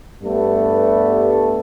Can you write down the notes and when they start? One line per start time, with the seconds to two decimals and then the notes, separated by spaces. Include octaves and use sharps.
0.23 G2 G3 A3 B3